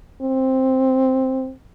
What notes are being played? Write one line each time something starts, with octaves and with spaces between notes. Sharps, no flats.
C4